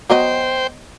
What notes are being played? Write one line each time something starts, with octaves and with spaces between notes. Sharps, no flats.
F#3 B3 C5 D#5 G5